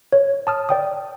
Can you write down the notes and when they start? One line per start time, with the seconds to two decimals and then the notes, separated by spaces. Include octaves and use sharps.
0.13 C#5
0.47 A5 D#6 F6
0.69 D5 G5 D#6